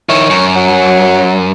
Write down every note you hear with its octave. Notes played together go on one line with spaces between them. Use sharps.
D#3 E4 C#5
F#2
F#3